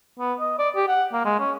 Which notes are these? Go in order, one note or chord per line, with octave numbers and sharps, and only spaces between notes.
B3
D#5
D5
G4
F#5
A#3
G#3
C#4